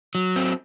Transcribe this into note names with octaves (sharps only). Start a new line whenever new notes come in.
F#3
C4